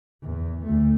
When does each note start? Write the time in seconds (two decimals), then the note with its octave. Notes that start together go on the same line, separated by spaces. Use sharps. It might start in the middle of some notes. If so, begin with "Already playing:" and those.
0.22 E2
0.64 D2 A3